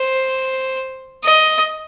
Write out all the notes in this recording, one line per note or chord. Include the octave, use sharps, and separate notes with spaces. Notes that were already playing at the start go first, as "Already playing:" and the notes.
Already playing: C5
D#5